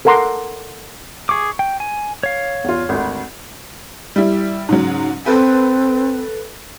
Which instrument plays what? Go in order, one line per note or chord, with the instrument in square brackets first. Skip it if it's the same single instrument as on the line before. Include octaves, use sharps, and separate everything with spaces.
[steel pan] A4 A#4 F#5 A#5 C6 D6
[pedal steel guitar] G#4 D6 [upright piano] C#6
[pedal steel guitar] G5
G#5
C#5 F5
[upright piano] E2 F4
G#1 D2
[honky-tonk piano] G3 E4
G#2 C#3 F#3
[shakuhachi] C4 [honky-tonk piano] A4 B4